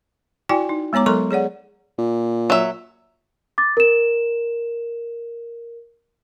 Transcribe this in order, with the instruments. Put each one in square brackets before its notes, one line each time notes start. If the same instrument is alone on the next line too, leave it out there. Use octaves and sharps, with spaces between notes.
[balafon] E4 F#4 D5 G5 G#5
D#4
G#3 B3 C#5 A#5 D6
F#3 A4 A#4 A#5 C6 C#6
G#4 C#5 D5 F#5
[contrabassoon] A#2
[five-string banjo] F#3 E5
[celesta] D6 A6
A#4 E7